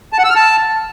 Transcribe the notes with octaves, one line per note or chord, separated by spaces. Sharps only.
A5
F#5
E6
F6
A5